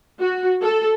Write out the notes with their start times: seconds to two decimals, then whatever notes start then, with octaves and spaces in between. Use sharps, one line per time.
0.19 F#4
0.61 A4